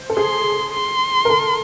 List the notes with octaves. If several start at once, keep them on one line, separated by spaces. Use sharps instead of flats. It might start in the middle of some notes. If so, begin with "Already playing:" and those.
Already playing: C5
A4
G#4 C6
C6
A#4
A4